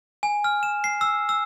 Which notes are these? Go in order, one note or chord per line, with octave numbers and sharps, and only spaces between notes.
G#5
F6
E7
C7
E6
E6